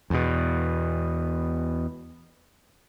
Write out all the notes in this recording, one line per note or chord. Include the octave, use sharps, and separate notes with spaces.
E2 B2